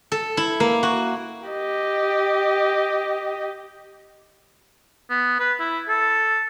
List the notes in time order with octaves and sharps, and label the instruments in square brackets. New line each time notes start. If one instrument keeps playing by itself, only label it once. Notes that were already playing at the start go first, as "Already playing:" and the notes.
[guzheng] A4
E4
A#3
F#4
[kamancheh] G4 D#5
[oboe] B3
B4
E4
A4